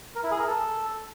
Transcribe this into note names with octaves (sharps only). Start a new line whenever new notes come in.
A#4
E4
G#4
A#4
A4